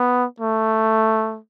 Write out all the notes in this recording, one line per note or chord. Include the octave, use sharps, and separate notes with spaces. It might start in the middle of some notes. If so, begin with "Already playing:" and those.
Already playing: B3
A3